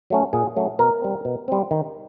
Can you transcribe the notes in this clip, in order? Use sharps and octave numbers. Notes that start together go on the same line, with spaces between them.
F#3 A3 C#4
A#2 G#4
F#3 A3 C#4
B2 A#4
G3 C4
B2
G3 C4
D#3